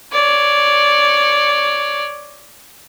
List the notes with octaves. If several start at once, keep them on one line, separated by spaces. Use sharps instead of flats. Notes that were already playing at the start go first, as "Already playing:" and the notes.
C#5 D5